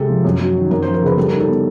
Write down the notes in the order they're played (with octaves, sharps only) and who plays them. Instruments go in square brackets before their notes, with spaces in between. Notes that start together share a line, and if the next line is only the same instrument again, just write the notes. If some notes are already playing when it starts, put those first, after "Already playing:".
Already playing: [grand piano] C3 G#3 [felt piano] A4
[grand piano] F3
F#2
F#3
D#3
[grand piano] F#2 [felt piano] A#4
[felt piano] C5
[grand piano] F3
[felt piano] A#4
[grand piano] C#3 [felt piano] B4
[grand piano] G3 [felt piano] A4
[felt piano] A#4
[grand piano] D#4
[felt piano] A4
[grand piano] B3